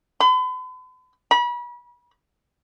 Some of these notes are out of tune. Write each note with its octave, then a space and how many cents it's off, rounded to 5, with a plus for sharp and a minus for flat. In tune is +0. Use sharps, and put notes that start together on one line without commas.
B5 +45
B5 -35